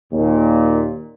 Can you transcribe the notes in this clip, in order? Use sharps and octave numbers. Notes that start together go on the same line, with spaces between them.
D#2 A#2